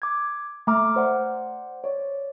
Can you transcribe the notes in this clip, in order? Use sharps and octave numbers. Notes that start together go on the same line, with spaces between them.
D6 G#6
A3 A#5 D6 F6
C5 D5 F#5 C6
C#5 D5